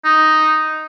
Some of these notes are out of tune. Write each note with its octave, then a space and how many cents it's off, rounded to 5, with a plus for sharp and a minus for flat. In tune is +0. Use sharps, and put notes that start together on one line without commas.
D#4 +0